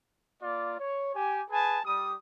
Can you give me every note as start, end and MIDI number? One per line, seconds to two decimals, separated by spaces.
0.43 0.78 58
0.43 0.78 65
0.43 0.78 74
0.79 1.14 73
1.15 1.43 67
1.15 1.43 80
1.50 1.79 68
1.50 1.79 71
1.50 1.79 80
1.50 1.79 81
1.85 2.15 55
1.85 2.15 87